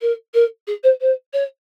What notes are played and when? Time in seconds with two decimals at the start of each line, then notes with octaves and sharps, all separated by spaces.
0.02 A#4
0.34 A#4
0.67 G#4
0.84 C5
1.01 C5
1.33 C#5